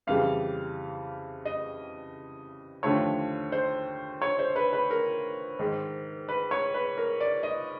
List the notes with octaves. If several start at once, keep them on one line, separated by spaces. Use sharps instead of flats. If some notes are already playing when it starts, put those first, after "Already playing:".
F2 C#3 E3 G3 F5
D#5
D#2 D3 F3 A3 C#5
C5
C#5
C5
B4
B4
A#4
G#2 D#3 G#3
B4
C#5
B4
A#4
D5
D#5